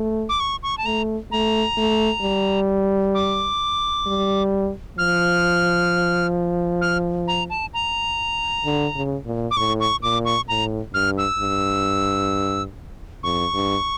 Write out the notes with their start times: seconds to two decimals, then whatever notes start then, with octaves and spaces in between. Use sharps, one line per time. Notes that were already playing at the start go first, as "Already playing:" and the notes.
Already playing: A3
0.29 D6
0.40 C#6
0.63 C#6
0.78 A5
0.85 A3 A#5
1.31 A3 A#5
1.77 A3
2.23 G3
3.14 D6
4.06 G3
4.98 F3 F6
6.81 F6
7.27 A#5
7.50 A5
7.73 A#5
8.65 D3
8.95 C#3
9.26 A#2
9.51 D6
9.56 A2 C#6
9.80 C#6
10.02 A#2 D6
10.25 C#6
10.48 A2 A#5
10.94 G2 F6
11.18 E6
11.40 G2
13.23 F2 C#6
13.54 G2